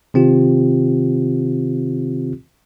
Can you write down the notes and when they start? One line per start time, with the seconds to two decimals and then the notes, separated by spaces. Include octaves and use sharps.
0.14 C3 D#3 C4 F4 G4